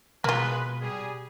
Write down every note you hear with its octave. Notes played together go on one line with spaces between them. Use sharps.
B2 G#3 A#3 F4 B4
G3 G#4